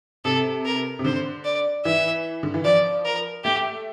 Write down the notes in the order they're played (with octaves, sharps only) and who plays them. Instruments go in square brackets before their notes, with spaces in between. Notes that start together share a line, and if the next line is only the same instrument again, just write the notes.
[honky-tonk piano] C3 [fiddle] A4
[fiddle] A#4
[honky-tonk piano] C3
[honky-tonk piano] D3 [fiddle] C5
[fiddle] D5
[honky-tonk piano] E3 [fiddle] E5
[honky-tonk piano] D3
E3
[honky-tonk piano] F3 [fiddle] D5
[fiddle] A#4
[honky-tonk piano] A3 [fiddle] G4